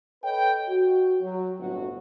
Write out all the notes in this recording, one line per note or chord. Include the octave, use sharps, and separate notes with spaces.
A4 B4 C#5 D#5 G5
F#4
F#3
G1 A2 F#3 C4 F#4